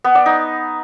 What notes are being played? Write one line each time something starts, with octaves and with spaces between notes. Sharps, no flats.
B3
D5
D#4